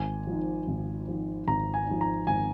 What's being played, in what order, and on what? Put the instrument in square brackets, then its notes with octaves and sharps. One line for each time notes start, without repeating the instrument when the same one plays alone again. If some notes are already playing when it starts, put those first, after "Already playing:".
Already playing: [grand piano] G#1 G#5
G#2 F3
G#1
G#2 F3
G#1 A#5
G#5
G#2 F3
A#5
G#1 G#5